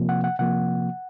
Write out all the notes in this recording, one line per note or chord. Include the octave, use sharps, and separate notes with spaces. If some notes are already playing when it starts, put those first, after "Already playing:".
Already playing: C3 F3 A#3
F#5
F#5
C3 F3 A#3 F#5